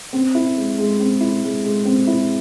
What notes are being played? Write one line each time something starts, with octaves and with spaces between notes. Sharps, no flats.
C4
E4
G#3
G#3
C4
E4
G#3
G#3
C4
E4